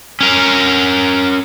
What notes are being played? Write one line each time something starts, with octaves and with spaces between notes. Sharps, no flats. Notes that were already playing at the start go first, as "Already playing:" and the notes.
C#4 A#4